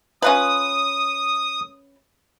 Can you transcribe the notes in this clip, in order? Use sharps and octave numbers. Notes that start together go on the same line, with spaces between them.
C#4 F4 B4 D#6